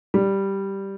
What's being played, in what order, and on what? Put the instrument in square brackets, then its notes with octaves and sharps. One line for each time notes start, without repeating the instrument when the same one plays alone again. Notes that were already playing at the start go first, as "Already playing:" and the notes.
[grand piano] G3